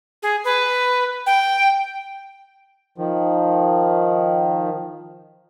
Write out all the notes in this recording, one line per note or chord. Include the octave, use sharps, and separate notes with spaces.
G#4
B4
G5
D#3 F3